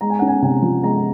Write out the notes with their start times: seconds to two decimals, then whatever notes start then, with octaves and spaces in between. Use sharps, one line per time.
0.01 G#3 A#5
0.10 G#5
0.19 C#4 F#5
0.28 G#5
0.42 C3 G#5
0.62 F3
0.83 G#3 A#5